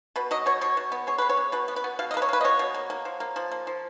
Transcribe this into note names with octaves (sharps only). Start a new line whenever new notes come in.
B2 B4
F#3 D#5
B2 C#5
B2 C#5
B2
B3
G#3 C#5
G#3 B4
C#5
B3
B2 B4
B3
B4
B3
B2 F5
D#5
A#3 B4
C#5
A#3 B4
D#5
B2 C#5
B2
A#3
A#3
F3
A#3
F3
A#3
F3